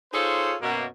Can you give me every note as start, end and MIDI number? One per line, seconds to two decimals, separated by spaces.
0.13 0.55 63
0.13 0.55 65
0.13 0.55 68
0.13 0.55 69
0.13 0.55 72
0.13 0.55 73
0.62 0.86 42
0.62 0.86 47
0.62 0.86 58